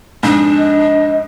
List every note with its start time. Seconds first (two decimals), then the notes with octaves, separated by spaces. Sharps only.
0.23 F2 G#2 D4
0.57 D#5